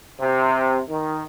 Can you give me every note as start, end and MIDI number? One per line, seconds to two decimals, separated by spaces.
0.19 0.80 48
0.88 1.22 51